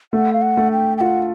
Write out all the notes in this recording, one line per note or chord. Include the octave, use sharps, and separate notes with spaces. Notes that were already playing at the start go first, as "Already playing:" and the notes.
A3 F#5
F5
F#5
A3
G5
G5
F4 F#5